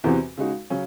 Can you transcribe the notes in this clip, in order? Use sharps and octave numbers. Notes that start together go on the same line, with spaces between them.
E2 C3 E3 C4 F#4
C#3 G#3 D#4 F#4
C#3 F#3 C#4